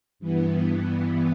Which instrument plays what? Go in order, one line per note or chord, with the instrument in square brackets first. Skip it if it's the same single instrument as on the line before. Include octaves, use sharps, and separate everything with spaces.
[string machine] G2 E3 B3